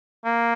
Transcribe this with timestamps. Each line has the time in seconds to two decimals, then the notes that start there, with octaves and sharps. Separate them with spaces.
0.25 A#3